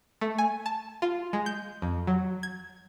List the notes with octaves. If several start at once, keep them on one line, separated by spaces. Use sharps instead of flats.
A3
G#5
A5
F4
G#3
G6
F2
F#3
G#6